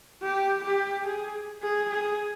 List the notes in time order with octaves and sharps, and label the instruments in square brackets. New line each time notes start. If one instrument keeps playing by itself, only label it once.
[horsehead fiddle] G4
G4
G#4
G#4
G#4